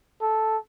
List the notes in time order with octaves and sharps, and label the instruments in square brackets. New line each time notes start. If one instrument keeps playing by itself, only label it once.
[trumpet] A4